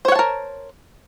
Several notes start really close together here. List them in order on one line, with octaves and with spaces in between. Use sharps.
C5 C#5 F#5 A5 A#4